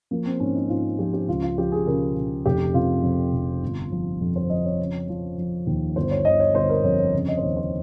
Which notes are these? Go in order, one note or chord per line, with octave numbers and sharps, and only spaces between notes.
F3 A#3
C4
G#2 C#4
D#4
G#2 F4
F3 G4
G4
C#2 F4
F4
F3 G4
G#4
C#3 A#4
C#3
F1 G4
C3 F4
F2
F1
G1
F3
F2
C5
F3 D#5
C#5
C#3
F3
F3
D#2
G1 C5
C#5
G1 D#5
C#5
G1 C5
A#4
F2 C#5
C#5
C#3
D#5
C5
D#2 C#5
C5